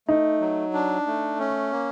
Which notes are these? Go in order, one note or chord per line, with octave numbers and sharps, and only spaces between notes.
A3 D#4
F#3
D4
A3
C#4
A#3